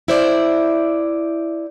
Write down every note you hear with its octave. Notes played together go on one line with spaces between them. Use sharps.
E4 C5 D5